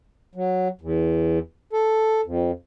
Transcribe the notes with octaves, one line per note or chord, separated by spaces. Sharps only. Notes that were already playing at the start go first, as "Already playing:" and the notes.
F#3
E2
A4
F2